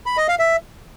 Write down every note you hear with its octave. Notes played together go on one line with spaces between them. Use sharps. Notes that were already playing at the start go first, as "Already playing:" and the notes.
B5
D#5
F5
E5